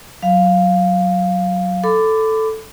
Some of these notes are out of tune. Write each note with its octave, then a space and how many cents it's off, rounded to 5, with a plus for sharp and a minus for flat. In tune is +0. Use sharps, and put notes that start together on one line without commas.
F#3 +0 F5 +0
A4 +0 B5 +30 D6 +0